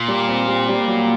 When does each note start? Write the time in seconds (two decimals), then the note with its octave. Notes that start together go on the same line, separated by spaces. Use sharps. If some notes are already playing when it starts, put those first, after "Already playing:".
Already playing: A#2
0.08 G3
0.28 C4
0.48 G3
0.69 G3
0.88 F#3